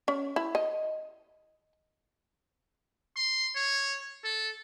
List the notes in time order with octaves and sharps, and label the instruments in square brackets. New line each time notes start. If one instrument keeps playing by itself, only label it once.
[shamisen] C#4
E4
D#5
[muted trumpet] C6
C#5
A4